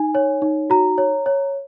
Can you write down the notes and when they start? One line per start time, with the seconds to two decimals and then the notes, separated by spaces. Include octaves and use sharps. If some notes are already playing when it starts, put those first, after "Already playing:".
Already playing: D#4 G#5
0.15 C#5
0.42 D#4
0.70 F#4 A#5
0.98 C#5
1.26 C#5